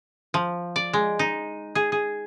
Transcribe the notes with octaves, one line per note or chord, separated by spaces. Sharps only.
F3
D5
G#3
D#4
G#4
G#4